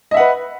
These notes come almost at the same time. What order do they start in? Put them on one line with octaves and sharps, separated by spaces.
D#5 E5 F#5 B4